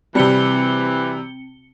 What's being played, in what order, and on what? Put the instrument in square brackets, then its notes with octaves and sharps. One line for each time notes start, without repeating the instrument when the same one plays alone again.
[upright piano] C3 G3 [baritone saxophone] E3 [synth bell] C4 C#7 G7